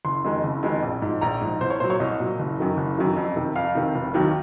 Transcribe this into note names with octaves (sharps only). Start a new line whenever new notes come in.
F#1 C6
F2 D#3 G#3
F#1
F2 D#3 G#3
A#1
G#2 F3
A#1 A#5
G#2 F3
C2 C5
C#5
A#2 F#3 C5
C#5
C2 D#5
A#2 F#3
F#1
F#2 D#3 F#3
F#1
F#2 D#3 F#3
F2
C3 D#3
F2 F5
C3 D#3
F1
D#2 D#3 F#3